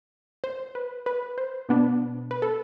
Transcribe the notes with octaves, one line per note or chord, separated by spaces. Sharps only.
C5
B4
B4
C5
B2 B3 D4
B4
A4